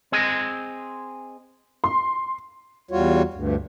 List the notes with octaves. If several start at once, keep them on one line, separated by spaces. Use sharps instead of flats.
C4 G#4 D#5
C6
E2 G3 F4 F#4 C#5
D2 G2